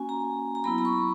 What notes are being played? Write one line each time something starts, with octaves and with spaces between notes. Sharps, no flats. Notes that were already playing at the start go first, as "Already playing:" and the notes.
Already playing: A#3 C#4 F#4 G#5
A#5
A#5
F#3 B3 E4 B5
B5
C#6